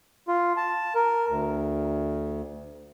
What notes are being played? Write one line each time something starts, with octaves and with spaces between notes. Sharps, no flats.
F4
A5
A#4
D2